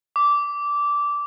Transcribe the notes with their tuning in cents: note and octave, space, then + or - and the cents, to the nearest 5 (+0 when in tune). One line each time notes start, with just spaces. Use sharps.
D6 -15